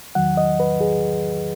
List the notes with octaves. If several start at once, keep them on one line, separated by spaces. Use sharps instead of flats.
E2 D#3 F#3 F#5
D#5
B4
G#4